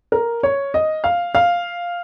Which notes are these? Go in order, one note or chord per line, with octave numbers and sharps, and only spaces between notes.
A#4
C#5
D#5
F5
F5